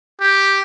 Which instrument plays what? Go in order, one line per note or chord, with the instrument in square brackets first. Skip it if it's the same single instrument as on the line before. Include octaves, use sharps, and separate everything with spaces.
[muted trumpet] G4